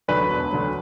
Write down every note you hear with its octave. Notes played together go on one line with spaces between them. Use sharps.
D2 D3 F#3 B4
E1
D2 D3 F#3